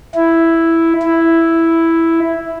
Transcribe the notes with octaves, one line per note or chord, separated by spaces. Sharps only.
E4
E4